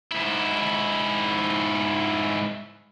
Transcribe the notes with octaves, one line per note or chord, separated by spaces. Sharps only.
G#2 E4